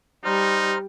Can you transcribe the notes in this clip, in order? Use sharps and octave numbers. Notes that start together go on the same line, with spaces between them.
G3 D#4 C5 A#5 F6